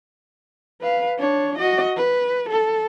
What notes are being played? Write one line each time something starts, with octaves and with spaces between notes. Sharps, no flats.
B4 F5
D4 C#5
F#4 D#5
B4
A4